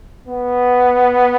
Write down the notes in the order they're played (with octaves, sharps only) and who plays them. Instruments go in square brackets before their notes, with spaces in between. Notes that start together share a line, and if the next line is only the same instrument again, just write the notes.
[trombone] B3